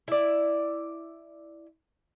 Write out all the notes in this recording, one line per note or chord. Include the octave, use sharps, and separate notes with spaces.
E4 D5